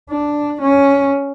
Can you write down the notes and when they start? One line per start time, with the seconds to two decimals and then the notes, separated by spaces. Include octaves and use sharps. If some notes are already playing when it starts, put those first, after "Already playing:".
0.11 D4
0.60 C#4